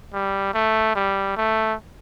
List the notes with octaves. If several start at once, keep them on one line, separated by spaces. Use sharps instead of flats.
G3
A3
G3
A3